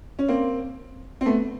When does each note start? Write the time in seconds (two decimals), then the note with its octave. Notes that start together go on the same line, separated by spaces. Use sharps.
0.19 C#4
0.28 A#3 C4
1.21 C4
1.26 A3 B3